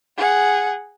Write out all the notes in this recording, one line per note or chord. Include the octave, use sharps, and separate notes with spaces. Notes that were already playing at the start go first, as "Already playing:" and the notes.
G#4 F#5